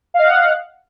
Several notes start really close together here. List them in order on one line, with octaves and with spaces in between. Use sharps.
F5 D#5 F#5